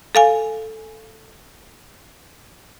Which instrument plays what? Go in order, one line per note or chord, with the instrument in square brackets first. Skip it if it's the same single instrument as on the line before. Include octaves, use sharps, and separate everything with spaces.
[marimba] A4 F5 G#5